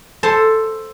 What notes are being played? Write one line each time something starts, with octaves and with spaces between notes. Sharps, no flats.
A4 C5 A5